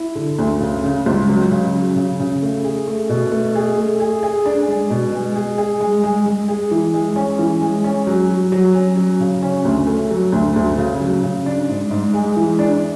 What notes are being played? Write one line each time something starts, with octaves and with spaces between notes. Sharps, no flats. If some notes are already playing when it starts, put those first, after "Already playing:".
Already playing: E4
D3
D2
C#3
C#3
C#2
F#3
C#3
F#3
C#3
C#3
A3
G#4
A3
B2
A3
G#4
A3
G#4
G#4
D4
G#3
B2
G#3
G#4
G#4
G#3
G#3
G#3
G#4
E3
G#3
C#4
E3
G#3
C#4
F#3
F#3
F#3
C#4
F#3
C#3
C#4
D2
A3
F#3
D2
D2
C#3
F#3
C#3
D4
G#2
G#2
G#3
E3
D4